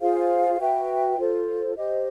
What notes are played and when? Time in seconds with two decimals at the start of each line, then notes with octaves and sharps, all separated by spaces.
0.01 F4 G#4 C5 F5
0.59 F#4 B4 E5 G5
1.18 F4 A4 C5
1.76 G4 C5 D#5